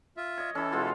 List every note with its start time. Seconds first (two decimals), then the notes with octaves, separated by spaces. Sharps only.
0.17 F4 E5
0.38 C#5 D#5
0.55 E3 C#4 E4 A4
0.72 B2 G#3 F4